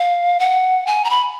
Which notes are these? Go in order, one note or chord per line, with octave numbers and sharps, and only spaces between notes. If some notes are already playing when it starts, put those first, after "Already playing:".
Already playing: F5
F#5
G#5
A#5
B5